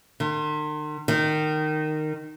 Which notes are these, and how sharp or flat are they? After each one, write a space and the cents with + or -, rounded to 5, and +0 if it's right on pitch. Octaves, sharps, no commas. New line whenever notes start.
D#3 -45
D#3 -15